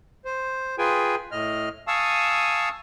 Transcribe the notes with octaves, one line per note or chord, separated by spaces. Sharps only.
C5
F4 G#4 B4 G5 G#5
A2 D#5 F6
F5 G#5 A5 C#6 D#6 E6